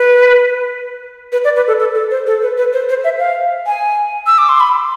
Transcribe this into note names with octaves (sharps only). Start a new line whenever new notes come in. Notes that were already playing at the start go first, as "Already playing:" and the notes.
Already playing: B4
B4
D5
B4
A4
A4
A4
C5
A4
B4
B4
C5
C5
E5
F5
G#5
E6
D6
C6
B5